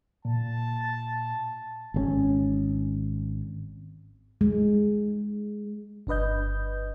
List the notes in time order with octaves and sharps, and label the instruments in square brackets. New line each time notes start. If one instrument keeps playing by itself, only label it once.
[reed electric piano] A#2 [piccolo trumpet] A5
[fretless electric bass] G#1 D3 C#4
[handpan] G#3
[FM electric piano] G1 D4 B4 D#5 G6